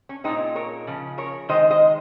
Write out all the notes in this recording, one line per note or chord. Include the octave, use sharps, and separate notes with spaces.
C#4
A#2 G#3 C4 D#4
A#4 C#5
C#3 F3
A#4 C#5
D#3 G#3 C5 D#5
C5 D#5